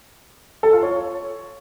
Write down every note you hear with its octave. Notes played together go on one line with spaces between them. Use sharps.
A4
F4
C#5